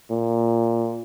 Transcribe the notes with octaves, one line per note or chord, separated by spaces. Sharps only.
A#2